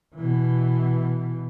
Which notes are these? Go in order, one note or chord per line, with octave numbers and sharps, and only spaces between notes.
B2 E3